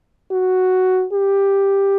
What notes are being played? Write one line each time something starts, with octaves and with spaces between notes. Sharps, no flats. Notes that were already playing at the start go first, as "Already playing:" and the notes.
F#4
G4